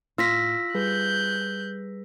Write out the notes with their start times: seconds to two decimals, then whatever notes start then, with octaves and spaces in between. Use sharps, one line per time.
0.18 A2 F4 E6 A#6 B6
0.75 G3 G#4 B4 F#6 G6